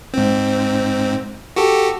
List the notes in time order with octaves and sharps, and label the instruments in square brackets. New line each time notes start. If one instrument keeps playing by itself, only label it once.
[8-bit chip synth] G#2 C4
F#4 G4 A4